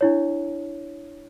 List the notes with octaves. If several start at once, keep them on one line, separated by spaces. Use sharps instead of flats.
D4 E4 C#5